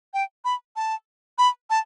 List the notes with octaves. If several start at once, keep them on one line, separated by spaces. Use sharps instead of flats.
G5
B5
A5
B5
A5